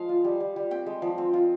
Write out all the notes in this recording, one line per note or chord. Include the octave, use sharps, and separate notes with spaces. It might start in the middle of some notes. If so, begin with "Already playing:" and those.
Already playing: F3 G#3 F5
F4
G3
G3
G3
C4 G5
G#3
F3
C4
F4